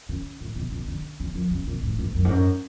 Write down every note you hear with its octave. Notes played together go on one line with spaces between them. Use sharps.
C#3
A2
B2
B2
D3
D3
F3
C#3
B2
A2
G#2
F#2
G#2
F#2